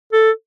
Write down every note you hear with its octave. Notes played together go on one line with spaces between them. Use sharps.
A4